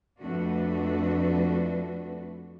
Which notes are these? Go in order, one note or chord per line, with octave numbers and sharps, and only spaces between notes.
F2 A3 D4 F#4 B4